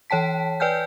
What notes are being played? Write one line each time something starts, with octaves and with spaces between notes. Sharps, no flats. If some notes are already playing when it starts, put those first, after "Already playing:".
E3 C#5 G5 A5 B6
B4 D5 G5 G#5 F6 G6